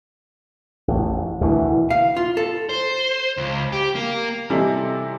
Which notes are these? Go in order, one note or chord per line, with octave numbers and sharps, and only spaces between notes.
A1 F2
D2 B2 D#3 E3
F5
F4
A4
C5
C#2
G4
A#3
C3 E3 G3 D#4 E4 A4